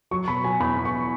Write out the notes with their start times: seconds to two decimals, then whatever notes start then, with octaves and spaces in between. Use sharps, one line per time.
0.11 F#3 C#6
0.27 B2 B5
0.44 F#3 G#5
0.60 E2 B5
0.77 E2
0.85 C#6